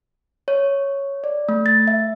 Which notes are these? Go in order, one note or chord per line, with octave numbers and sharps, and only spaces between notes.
C#5
D5
A3
A6
E5